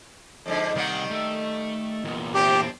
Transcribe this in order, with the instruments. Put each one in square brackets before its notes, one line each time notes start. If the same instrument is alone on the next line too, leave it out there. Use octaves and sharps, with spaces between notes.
[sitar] F2 G#2 D3
[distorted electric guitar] C2 F#5 [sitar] D#3 G3 A#3
[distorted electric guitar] A3
E2 A#2
[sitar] C3 C4 D4 [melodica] G4